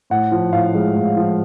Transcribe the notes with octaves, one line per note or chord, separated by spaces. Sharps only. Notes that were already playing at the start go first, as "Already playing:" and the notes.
A2 F#5
F3
A2 F5
G#3
A2
F3